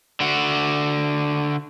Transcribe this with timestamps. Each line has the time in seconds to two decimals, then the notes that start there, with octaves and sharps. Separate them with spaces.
0.20 D3 F#4